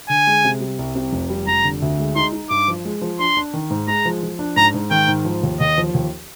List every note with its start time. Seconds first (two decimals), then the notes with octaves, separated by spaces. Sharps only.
0.09 D3 G#5
0.27 G#3
0.44 C3
0.61 G3
0.79 C2
0.95 C3
1.13 F1
1.30 G3
1.47 F1 A#5
1.64 D3
1.82 D2
1.99 G#3
2.16 D#4 C6
2.32 D#4
2.50 G2 D6
2.68 F3
2.85 G#3
3.02 F3
3.19 D4 C6
3.37 D4
3.54 D#3
3.70 G#2
3.88 G#3 A#5
4.05 F3
4.23 F3
4.39 D4
4.56 G#2 A#5
4.74 G#2
4.91 D#3 G5
5.08 G#2
5.25 F3
5.43 D#2
5.60 D#2 D#5
5.78 F3
5.94 D#2